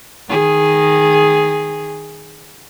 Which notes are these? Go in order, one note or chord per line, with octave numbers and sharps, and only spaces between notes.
D#3 G#4